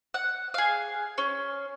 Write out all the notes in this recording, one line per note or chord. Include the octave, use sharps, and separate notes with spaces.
F#5
G#4 F5
C#4